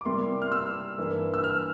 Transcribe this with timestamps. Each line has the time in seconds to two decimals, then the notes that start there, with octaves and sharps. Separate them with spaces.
0.01 D6
0.05 C3 G3 A#3 E4 C6
0.42 F6
0.52 E6
0.98 G2 E3 A#3 E4
1.34 E6
1.44 F6